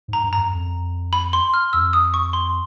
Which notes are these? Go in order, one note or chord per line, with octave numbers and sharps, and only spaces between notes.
G#2
A#5
G2
F#2 A#5
F2
B5
C6
F6
F2 E6
D#6
C#6
C6